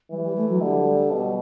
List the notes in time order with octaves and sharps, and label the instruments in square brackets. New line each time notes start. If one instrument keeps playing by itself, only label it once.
[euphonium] E3 [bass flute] G3
[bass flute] G3
A3
F#3
[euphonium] D3 [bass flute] G3
[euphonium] B2